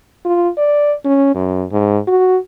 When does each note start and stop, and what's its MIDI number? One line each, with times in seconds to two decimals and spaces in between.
0.25 0.49 65
0.58 0.93 74
1.05 1.33 61
1.35 1.64 42
1.71 1.98 44
2.07 2.37 66